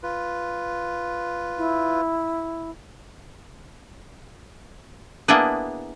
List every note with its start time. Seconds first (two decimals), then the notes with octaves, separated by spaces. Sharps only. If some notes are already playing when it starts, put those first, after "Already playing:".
0.03 F4 B4
1.58 E4
5.28 A#3 B3 D4 E4 G#4 B4